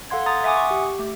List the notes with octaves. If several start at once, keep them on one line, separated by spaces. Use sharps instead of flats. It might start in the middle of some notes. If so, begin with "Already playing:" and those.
A4 F5 F#5 C6 G#6
A#5 C6 D#6 A6
E5 F#5 G#5 D6 D#6
C#6
G4
A3